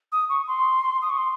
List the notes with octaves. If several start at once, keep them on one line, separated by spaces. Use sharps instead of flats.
D#6
C#6
C6
D#6
C#6
C6